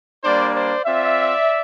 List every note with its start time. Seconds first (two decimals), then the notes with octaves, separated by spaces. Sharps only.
0.24 G3 A#3 D4 C5 D5
0.54 C5 D5
0.84 C4 F4 D5 E5